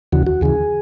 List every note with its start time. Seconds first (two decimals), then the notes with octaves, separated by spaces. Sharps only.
0.12 D#2 C#3 E3 F#4
0.27 F#4
0.41 D#2 C#3 E3 G#4